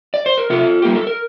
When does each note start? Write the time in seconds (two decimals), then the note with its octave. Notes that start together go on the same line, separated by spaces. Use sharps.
0.14 D5
0.26 C5
0.38 A#4
0.50 C3 F4 A4
0.82 G3 A#3 G4
0.95 A4
1.07 A#4